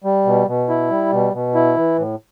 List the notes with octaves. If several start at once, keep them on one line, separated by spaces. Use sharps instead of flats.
G3
B2
B2
E4
G3
B2
B2
E4
E3
A2